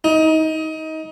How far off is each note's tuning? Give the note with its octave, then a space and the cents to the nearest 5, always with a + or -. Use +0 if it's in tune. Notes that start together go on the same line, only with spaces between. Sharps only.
D#4 +25